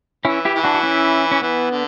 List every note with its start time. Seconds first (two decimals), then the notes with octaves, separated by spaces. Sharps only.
0.25 E3 C#4 E4
0.45 E4 G4
0.55 E3
0.64 D4 F#4
0.75 F#4
0.83 C#4 E4
1.31 C#4
1.42 E3 B3
1.71 D3